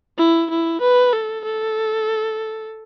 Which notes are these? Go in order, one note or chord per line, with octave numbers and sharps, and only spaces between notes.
E4
E4
B4
A4
A4